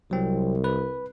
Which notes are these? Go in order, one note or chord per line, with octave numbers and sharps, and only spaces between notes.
C2 F#3 C4
B4